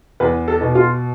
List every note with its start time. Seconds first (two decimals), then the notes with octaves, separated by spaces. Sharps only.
0.20 E2 B4
0.48 A4
0.61 B2
0.75 F4